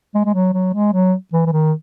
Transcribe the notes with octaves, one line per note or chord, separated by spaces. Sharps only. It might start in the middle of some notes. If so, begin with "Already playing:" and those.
G#3
G#3
F#3
F#3
G#3
F#3
E3
E3
D#3